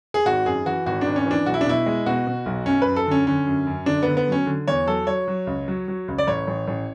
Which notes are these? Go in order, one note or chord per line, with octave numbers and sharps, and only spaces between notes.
G#4
G#1 F#4
F#2 G#4
E3 F#4
G#1 F#4
D4
G#1
C#4
E3
D4
B1 F#4
E4
D4
B2 E4
G#3
B2 F#4
B2
B1
F#2 C#4
B4
F#2
A4
D3 C#4
D3 C#4
F#2
F#2
D3 D4
B3
D3
B3
F#3 C#4
D3
E2 C#5
F#3 A4
F#3 C#5
F#3
C#2
F#3
F#3
C#2
D5
A1 C#5
A1
A1